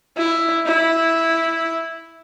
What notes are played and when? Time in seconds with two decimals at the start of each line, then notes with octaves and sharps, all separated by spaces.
0.17 E4
0.66 E4